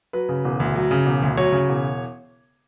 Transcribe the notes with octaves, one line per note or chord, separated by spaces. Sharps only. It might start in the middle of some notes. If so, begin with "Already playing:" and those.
F#3 B4
C#3
E1
D2
F#3
C#3
E1
D2
F#3 C#5
C#3
E1